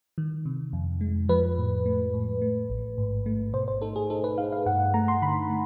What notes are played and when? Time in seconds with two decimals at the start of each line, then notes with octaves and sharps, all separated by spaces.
0.18 D#3
0.46 C3
0.73 F2
1.01 G#3
1.29 F3 B4
1.58 A2
1.86 A3
2.13 A2
2.42 A3
2.70 A1
2.98 G#2
3.26 A3
3.53 B2 C5
3.68 C5
3.82 D#4 A4
3.96 G#4
4.10 D#4 A4
4.24 B4
4.38 D#4 F5
4.52 F5
4.66 G2 F#5
4.94 A3 A#5
5.08 C6
5.22 D3 B5
5.50 A3